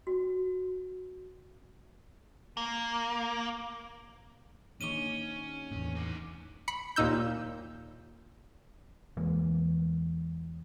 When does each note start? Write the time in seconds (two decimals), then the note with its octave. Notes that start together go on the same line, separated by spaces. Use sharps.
0.07 F#4
2.57 A#3
4.81 A#1 D#3 C#4 C#6 D#7 G7
5.71 E2 A2
5.95 D#4 F#5 D6
6.68 B5 C#7
6.96 D#2 A#2 D#4 E6 G6
9.17 E2 E3 G#3 A#3